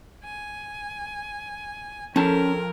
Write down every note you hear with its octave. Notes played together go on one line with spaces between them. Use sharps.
G#5
F2 C#4 A#4 A5